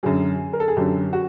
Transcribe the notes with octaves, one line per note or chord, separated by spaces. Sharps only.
F#2 D3 F#3 G#4
A#4
A4
G#4
F#2 D3 F#3 G4
F#4